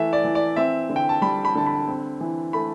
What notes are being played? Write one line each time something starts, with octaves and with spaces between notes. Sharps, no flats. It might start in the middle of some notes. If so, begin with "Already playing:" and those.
Already playing: E3 A3 E5
D5
E3
D5
C4 E5
D3
G5
A5
G3 B5
B5
D3 A5
B5
C4
E3
A3 B5